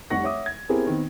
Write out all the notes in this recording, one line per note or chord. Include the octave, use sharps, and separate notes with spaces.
F1 G3 D#4 F#5 C#6 A#6
C#5 E5 F#5 D6 D#6
G#6
B3 C4 E4 G4 G#4 A#4
D#3 B3 C4